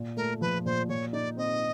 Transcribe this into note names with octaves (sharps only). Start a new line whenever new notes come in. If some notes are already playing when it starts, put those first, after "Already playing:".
Already playing: A#2
A3 A#4
F3 B4
A#2 C5
A#2 C#5
D#4 D5
C4 D#5